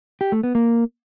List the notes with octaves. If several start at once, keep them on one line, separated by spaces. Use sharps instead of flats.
G4
A3
B3
A#3